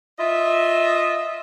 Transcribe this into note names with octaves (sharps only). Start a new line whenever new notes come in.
F4 D#5 E5